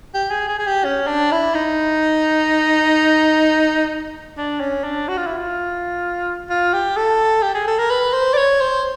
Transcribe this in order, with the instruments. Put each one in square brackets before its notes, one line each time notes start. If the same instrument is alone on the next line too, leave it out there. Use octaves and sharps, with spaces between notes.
[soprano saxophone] G4
G#4
G#4
G#4
G4
C#4
D4
E4
D#4
D4
C#4
D4
F#4
F4
E4
F4
F4
G4
A4
G4
G#4
A4
A#4
B4
C5
D5
C#5
C5